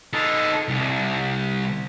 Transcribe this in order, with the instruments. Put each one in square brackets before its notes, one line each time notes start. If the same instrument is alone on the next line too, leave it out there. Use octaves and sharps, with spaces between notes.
[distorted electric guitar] D#4 A4
C2